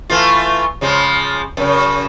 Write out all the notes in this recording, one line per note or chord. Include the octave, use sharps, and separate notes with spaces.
E3 A3 F4
C#3 F3 G#3
F#2 C#3